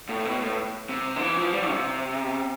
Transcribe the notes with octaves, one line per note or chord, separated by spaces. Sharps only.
A2
B2
A2
C3
D3
E3
F3
G3
C3